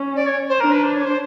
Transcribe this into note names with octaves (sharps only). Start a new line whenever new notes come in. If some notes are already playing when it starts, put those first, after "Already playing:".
Already playing: C#4
D5
C#5
C5
D4 A#4
B4
C5
C#5
C5